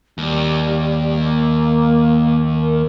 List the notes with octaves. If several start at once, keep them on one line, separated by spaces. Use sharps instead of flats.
D#2 G3
A#3
A#4